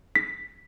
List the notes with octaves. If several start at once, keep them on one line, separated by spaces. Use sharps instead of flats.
B6